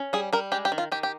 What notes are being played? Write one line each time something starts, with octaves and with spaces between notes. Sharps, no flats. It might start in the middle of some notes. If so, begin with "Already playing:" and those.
Already playing: C#4
G3 G#4
G3 A#4
G#3 G4
G4
D#3
F4
D#3 G4
G4